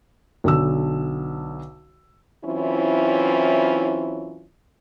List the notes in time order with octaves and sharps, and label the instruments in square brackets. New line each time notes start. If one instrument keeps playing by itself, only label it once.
[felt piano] B1 D3 E6
[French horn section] E3 F#3 C4 C#4 E4 F4